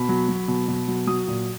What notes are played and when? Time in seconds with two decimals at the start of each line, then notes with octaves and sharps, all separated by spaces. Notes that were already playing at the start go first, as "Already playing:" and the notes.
Already playing: B2 B5
0.09 F#3
0.29 F#3
0.48 B2
0.68 B2
0.88 F#3
1.07 F#3 D#6
1.28 A#2